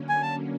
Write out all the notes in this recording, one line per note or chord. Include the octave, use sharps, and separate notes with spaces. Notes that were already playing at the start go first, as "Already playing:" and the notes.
Already playing: D3 F#3 A#3 C#4
G#5
A5